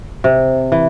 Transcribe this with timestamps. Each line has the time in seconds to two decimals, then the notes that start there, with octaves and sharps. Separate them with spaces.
0.24 C3
0.72 E3